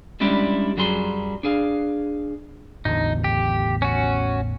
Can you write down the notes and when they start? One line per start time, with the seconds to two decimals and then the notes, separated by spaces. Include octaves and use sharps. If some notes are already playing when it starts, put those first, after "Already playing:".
0.20 G3 G#3 C#4 D4 E4 G4
0.77 F#2 F#3 G3 G#4 C6
1.43 D4 G#4 F5
2.85 A1 E2 D3 D#4
3.24 G4
3.82 C#4 F#4